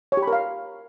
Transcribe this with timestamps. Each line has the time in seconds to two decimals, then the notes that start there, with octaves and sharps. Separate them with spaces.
0.12 C#5
0.17 G4
0.22 B5
0.28 A#4
0.33 F5